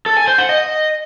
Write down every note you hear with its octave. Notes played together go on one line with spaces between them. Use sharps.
A4
G#5
C5
F#5
D#5